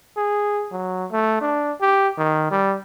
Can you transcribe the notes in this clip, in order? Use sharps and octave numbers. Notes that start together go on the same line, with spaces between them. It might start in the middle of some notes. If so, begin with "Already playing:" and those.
G#4
F#3
A3
D4
G4
D#3
G3